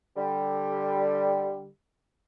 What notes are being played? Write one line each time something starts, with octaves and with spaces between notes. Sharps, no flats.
D3 G3